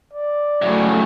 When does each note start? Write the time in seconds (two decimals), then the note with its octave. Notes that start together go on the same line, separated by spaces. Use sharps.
0.13 D5
0.62 A2 C#3 F#3 A3